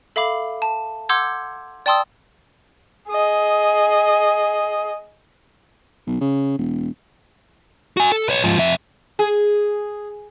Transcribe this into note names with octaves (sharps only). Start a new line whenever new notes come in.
A4 E5 F5 B5 D6
A5
F#5 C6 D6 E6 G6 G#6
D5 G5 A5 C6 D#6 E6
G#4 D#5
B1
C#3
E1
F#4 G#5
A4
B4 C#5
G#2 F3
F2 E5
G#4